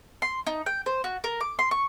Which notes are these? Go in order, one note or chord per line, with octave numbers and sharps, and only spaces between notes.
C6
D#4
G5
C5
F#4
A#4
D6
C6
C#6